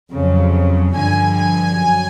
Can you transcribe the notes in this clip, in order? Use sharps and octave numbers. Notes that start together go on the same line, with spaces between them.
F2 C#3 F#3
G2 D3 F3 G#5
G#5
F#2